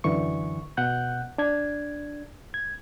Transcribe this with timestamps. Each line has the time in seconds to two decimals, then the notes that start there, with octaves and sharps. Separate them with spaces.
0.04 F#2 D3 E3 C#6
0.77 B2 F#5 F#6 G6
1.38 D4 G#6
2.54 G#6